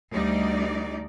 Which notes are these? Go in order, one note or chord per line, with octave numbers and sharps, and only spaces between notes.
D2 G3 D#4 D5